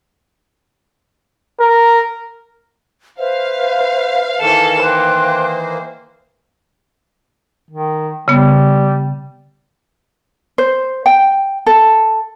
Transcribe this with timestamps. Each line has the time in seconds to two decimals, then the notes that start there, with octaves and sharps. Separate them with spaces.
1.60 A#4
3.18 B4 C5 E5 F5
4.41 D#3 E3 A#3 A4 E7
4.84 C5 G5 C6 F#6
7.71 D#3
8.28 C#3 G3 B3
10.58 C5
11.06 G5
11.66 A4